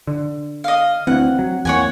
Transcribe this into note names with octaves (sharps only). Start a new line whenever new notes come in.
D3
D#5 F5
D2 E3 C4 F#5
F#3
E2 E3 A#3 C#5 F#5 G#5